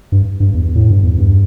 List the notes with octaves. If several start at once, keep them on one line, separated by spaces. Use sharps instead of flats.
G2
G2
E2
A2
G2
E2
G2